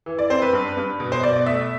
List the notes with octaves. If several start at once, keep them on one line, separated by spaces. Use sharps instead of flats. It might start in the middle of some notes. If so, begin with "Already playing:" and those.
E3
D5
C4 C5
B4
G2
G2
B2
C5
B2 D5
D5
A3 E5